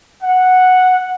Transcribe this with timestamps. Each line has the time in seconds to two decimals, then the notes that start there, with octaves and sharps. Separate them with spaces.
0.23 F#5